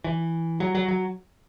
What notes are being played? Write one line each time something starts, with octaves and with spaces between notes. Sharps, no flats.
E3
F#3
F#3
F#3